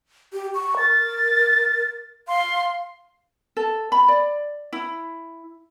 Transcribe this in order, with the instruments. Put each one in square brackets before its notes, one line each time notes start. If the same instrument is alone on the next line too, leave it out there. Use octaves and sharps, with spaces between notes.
[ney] G4
C#6
[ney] A#4 [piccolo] A6
[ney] F5 [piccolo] C6
[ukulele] A4
B5
D5
E4